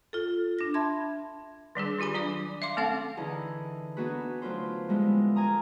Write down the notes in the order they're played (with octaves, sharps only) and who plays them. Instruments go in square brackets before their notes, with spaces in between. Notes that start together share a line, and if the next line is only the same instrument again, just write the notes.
[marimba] F4 A4
D4 A#6
E5 A5 B5 C6 G#6
[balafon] D#3 G3 D4 G#4
D#3 F4 G4 G#5 B5
F#3 D4 D5 D6
E5 F5 C6 D6
A3 C4 C#4 A4 F5 F#5
[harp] D3 E3 D#4 E4 G#4
B3 D4 D#4 F#4 G#4 B4
D2 F#3 D4 F4 B4 C5
F3 G3 G#3 B3 D4 E4
A#4 G#5 A#5 D#6